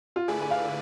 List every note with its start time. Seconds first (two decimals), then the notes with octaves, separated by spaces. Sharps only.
0.16 F4
0.28 D3 A3 E4 G#4 B4 D5
0.41 G#5
0.51 F5